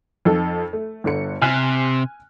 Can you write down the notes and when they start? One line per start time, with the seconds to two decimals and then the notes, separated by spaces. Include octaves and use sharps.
0.25 F2 D#4 A4
0.73 A3
1.04 G1 D3 C#7
1.42 C3 G#5 F6 F#6